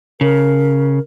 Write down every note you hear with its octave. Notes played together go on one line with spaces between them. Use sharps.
C#3 A#4